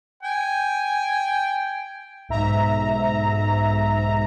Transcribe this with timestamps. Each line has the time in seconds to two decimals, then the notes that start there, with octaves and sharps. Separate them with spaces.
0.23 G5 G#5
2.29 B1 G#2 E5 A#5